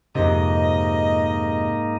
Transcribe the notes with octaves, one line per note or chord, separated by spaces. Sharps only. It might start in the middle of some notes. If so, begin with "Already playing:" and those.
F2 G#2 C3 A#3 D#4 D#5